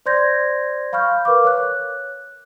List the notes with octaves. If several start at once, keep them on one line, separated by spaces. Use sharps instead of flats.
C5 D5 C6 G6 G#6 A#6
F5 B5 C#6 F6 G6
A#4 B4 F5 D6
C#5 F#6